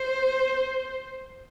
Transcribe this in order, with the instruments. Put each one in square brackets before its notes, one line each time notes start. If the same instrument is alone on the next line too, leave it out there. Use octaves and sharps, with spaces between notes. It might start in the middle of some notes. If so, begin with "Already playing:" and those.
Already playing: [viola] C5